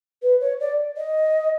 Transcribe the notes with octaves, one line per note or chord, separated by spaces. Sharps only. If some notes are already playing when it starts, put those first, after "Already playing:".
B4
C#5
D5
D#5